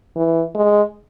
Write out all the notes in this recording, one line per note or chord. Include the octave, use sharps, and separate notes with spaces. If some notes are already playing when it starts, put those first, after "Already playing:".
E3
G#3